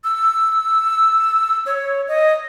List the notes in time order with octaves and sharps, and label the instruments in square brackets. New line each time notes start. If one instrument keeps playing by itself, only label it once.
[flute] E6
C#5
D#5